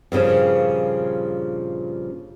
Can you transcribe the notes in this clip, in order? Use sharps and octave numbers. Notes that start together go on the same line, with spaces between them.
G2 A#2 C#3 F3